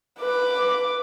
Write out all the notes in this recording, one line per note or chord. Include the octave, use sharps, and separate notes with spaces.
B4 D6